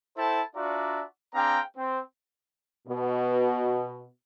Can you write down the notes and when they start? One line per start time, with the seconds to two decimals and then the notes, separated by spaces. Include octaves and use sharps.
0.18 E4 A4 C5 G5 A5
0.56 D4 F4 F#4 D5 E5 A#5
1.35 C4 D4 G#4 F5 G5 A#5
1.77 C4
2.88 B2